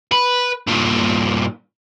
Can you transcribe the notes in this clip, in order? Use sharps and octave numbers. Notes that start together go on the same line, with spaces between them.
B4
G2 A#2